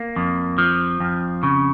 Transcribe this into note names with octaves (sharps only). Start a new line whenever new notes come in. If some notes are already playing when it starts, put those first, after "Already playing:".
Already playing: A#3
F2
F3
F2
C#3